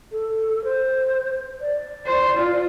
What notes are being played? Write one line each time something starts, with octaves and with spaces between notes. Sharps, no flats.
A4
C5
D5
C5
F4